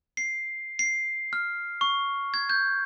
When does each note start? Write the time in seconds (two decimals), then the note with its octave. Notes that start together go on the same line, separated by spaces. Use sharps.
0.17 C7
0.79 C7
1.33 F6
1.81 C#6
2.34 G#6
2.50 G6